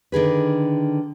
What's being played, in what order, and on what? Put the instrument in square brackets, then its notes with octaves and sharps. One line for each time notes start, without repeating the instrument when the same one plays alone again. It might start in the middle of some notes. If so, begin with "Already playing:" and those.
[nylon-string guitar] D3 D#3 G#4 B4